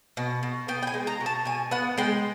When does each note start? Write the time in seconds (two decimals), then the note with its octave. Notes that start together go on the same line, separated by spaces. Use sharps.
0.17 B2
0.43 B2
0.68 B3 G5
0.83 G5
0.87 G#5
0.94 G#3
1.07 A#5
1.20 B2
1.26 A5
1.45 B2 G#5
1.71 B3 F#5
1.98 G#3 G5